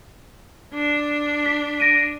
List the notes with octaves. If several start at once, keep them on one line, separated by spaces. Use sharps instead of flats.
D4
B6
A#6 D7 D#7